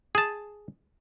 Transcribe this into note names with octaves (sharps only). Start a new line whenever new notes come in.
G#4 A5